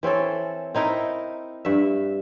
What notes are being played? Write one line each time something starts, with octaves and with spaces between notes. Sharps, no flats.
E3 C4 C#4 A4
C4 D#4 E4 A#4
G2 E5